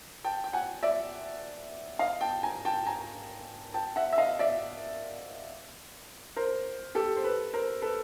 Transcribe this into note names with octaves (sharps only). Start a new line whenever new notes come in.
G5 A5
G5
F#5 G#5
D5 E5
D#5 F5
G5 A5
G#5 A#5
G5 A5
G#5 A#5
G5 A5
E5 F#5
E5
D#5 F5
D5 E5
A#4 C5
G4 A4
C5
A4 B4
A#4 C5
A4 B4